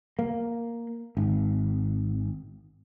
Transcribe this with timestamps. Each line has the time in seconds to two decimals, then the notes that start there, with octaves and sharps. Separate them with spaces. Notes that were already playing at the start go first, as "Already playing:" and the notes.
0.19 A#3
1.17 G#1